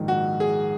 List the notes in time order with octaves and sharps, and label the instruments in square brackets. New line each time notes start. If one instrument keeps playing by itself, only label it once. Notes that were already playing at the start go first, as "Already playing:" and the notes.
Already playing: [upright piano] A#1 G#2 D#3
[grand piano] F#4
G#4